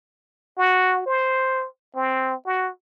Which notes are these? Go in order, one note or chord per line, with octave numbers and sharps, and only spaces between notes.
F#4
C5
C4
F#4